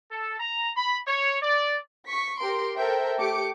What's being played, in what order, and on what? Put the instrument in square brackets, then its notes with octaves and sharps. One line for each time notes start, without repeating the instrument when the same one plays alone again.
[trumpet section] A4
A#5
B5
C#5
D5
[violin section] C#6 B6
G4 A#4 C6 D7
A4 A#4 C5 E5 G5
A3 G4 D6 C#7 D7